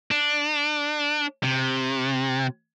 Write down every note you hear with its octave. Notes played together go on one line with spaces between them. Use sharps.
D4
C3